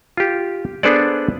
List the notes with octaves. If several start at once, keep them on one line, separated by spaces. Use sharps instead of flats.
F4 G4
B3 D4 G#4 A4 C5 D5